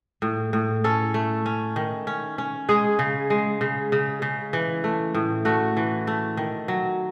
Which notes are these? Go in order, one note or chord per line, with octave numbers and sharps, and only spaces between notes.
A2
A2
C#4 A4
A3
C#4
D#3
C#4
C#4
G#3 G#4
C#3
G#3
C#3
C#3
C#3
E3
A3
A2
A3 F#4
E3
A3
D#3
F#3